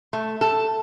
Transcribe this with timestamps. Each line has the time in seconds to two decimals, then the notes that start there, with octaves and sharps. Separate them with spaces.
0.13 A3
0.41 A4